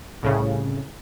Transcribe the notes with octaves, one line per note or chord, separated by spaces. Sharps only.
C2 A2 C#3